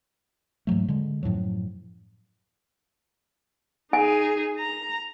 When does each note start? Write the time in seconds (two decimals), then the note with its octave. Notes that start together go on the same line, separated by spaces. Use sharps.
0.67 G#2 E3 F#3 A3
0.88 D3 G#3
1.23 F#2 A2 F3 F#3
3.93 D#4 G#4 G#5
4.58 A#5